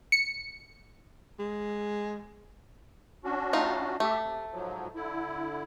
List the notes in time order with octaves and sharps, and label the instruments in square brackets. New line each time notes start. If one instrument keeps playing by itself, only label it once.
[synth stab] C#7
[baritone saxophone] G#3
[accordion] C#4 D4 F#4
[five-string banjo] A3 D#4 F4
[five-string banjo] A3 [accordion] G4 E5
[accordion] C3
G#2 F3 F#3
D3 E4